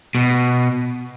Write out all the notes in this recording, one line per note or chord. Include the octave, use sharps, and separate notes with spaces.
B2